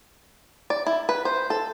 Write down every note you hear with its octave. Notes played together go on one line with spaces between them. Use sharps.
D5
E4
B4
C5
A4